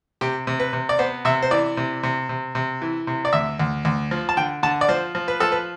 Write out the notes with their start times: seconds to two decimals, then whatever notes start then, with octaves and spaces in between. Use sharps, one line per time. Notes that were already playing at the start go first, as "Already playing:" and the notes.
0.21 C3 G4
0.47 C3
0.60 B4
0.73 C3
0.89 D5
0.99 B3 C5
1.25 C3 E5
1.43 C5
1.51 E3 D5
1.77 C3
2.03 C3
2.29 C3
2.55 C3
2.82 E3
3.07 C3
3.25 D5
3.33 D2 E5
3.60 D2
3.85 D2
4.11 F3
4.29 A5
4.37 D3 G5
4.63 D3 A5
4.81 D5
4.89 F3 C5
5.15 F3
5.28 B4
5.40 F3 A4
5.52 B4